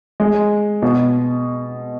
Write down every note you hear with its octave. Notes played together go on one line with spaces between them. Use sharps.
G#3
B2